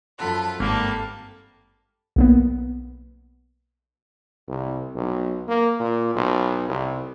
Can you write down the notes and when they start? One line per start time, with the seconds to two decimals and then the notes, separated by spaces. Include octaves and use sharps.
0.19 F#2 F3 F4 A4 F#5 B5
0.60 G#1 G2 G3 A#3 A5
2.16 B1 A#3 B3
4.48 C2
4.95 B1
5.48 A#3
5.80 A#2
6.15 B1
6.68 C2